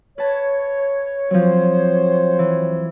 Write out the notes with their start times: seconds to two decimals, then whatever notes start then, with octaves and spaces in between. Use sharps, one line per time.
0.18 B4 C#5 A5
1.31 F3 F#3 C4 C5
2.39 E3